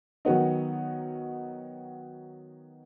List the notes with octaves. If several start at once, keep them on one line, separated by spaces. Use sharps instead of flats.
D#3 F#3 B3 D#4